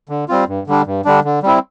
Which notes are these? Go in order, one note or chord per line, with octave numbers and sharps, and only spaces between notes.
D3
G3 C4 F4
G2
D3 G3 D4
G2
D3 G3 D4
D3
G3 C4 E4